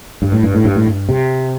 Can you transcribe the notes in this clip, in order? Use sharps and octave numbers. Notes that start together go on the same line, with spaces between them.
G2
A2
G2
A2
G2
A2
G2
C3